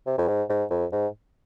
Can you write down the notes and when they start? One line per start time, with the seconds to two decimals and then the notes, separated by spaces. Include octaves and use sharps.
0.06 C3
0.18 F2
0.28 G#2
0.49 G#2
0.70 F2
0.92 G#2